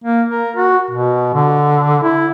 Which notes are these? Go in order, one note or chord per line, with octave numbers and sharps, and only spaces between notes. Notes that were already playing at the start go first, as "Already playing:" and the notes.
A#3
A#4
F#4
B2
D3
E4